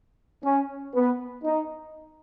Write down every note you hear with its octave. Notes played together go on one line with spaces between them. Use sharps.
C#4
B3
D#4